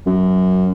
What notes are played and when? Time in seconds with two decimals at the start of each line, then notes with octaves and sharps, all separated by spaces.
0.06 F#2